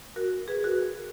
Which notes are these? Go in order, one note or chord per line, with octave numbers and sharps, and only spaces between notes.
F#4 A#4
G#4 B4
F#4 A#4